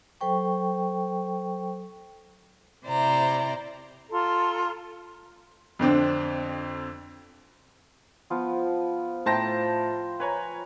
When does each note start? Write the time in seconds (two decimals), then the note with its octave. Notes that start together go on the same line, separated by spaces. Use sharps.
0.21 F#3 A4 C5 G5 C#6
2.86 C3 E4 C5 D5 A#5
4.11 F4 A4 A#5 C6
5.79 F2 D3 C4 D4
8.30 F3 B3 F4
9.26 A2 C5 G5 A5 A#5 A#6
10.20 B4 C#5 G#5 A#5